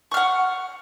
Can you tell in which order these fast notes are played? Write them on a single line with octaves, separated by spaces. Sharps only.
C#6 F6 F#5